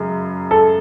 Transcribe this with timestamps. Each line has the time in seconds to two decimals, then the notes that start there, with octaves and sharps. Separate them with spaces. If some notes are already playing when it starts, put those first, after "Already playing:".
Already playing: F#2 C#3 G#3
0.51 A4